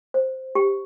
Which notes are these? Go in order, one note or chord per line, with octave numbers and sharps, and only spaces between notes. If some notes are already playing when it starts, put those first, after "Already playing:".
C5
G4